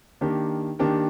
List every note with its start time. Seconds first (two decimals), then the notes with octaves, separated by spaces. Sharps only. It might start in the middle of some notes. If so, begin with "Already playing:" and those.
0.21 D#3 A#3 D4 G4 A#4
0.79 D#3 A#3 D4 G4 A#4